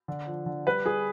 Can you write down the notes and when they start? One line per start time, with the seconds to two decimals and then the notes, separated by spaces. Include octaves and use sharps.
0.08 D3
0.27 F3
0.46 D3
0.67 G3 B4
0.85 G3 G#4